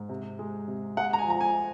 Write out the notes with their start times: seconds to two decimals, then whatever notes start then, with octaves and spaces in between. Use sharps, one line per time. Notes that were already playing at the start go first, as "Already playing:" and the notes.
Already playing: G#2
0.09 C3
0.39 G#3
0.68 C3
0.97 G#3 F#5
1.13 A#5
1.18 G#5
1.27 F3 A#5
1.41 G#5